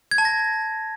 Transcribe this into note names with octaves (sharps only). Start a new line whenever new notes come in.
G#6
A5
A#6